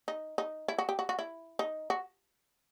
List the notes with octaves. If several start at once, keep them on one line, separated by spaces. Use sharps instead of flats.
D#4
D#4
E4
F#4
G4
F#4
F#4
E4
D#4
F#4